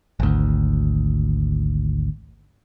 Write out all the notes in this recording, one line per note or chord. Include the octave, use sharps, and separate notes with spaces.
G#1 D2